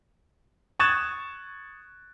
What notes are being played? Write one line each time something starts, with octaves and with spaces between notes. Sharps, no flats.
C#6 D#6 F#6 G#6 A6 E7